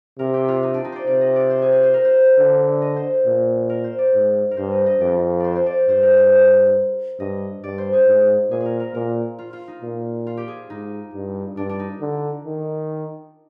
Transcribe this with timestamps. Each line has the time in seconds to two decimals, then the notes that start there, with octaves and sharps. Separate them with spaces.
0.19 C3 A#4
0.34 G4
0.48 F4
0.63 D#4
0.74 D4
0.84 D#4
0.92 C5 D5
1.07 C3 D5
1.21 D#5
1.36 D5
1.50 C5
1.62 G#4
1.72 G#4
1.83 C5
1.94 A#4
2.05 C5
2.38 D3
2.82 D#5
2.96 C5
3.26 A#2
3.69 A#4
3.84 C5
3.99 D5
4.14 G#2
4.51 A#4
4.57 G2 C5
4.72 D#5
4.86 D#5
5.00 F2 D5
5.40 C5 D5
5.56 C5
5.66 D5
5.88 G2 C5
6.03 A#4
6.17 C5
7.20 G2 D#5
7.63 G2 D5
7.78 C5
7.93 G#4
8.07 G#2
8.50 A#2 G#4
8.60 G#4 A#4
8.80 A#4
8.94 A#2 A#4
9.39 F4
9.53 F4
9.68 D#4
9.82 A#2
10.27 F4
10.37 G4
10.48 G#4
10.70 G#2 D#4
11.14 G2
11.57 G2 D4
11.69 D4
11.79 D#4
12.01 D3
12.45 D#3